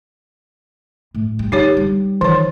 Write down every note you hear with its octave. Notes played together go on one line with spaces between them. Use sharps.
A2
G2
D3 D#4 G4 C#5
G3
D#3 E3 C#5